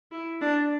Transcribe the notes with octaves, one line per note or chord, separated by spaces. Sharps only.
E4
D4